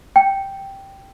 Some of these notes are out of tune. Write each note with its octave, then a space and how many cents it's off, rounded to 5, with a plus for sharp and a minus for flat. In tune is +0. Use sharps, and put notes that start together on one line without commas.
G5 -5